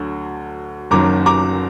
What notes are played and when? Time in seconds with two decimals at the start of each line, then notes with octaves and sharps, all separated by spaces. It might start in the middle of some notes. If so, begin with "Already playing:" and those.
Already playing: D2 D3 F#3
0.91 F#1 F#2 D#3 F#3 A#5 D6
1.26 A#5 D6